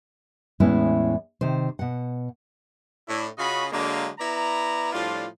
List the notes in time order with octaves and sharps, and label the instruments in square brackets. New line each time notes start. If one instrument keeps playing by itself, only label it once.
[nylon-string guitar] E2 A2 G#3 B3 C#4 E4
C3 D#3 C5
B2 F#5
[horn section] A2 D4 E4
C#3 C#4 F4 F#4 D#5 B5
D3 F#3 G#3 A#3
B3 E4 D5 A#5
A2 F3 G3 D4 F4